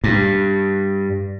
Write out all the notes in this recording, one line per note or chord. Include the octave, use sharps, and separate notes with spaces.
G2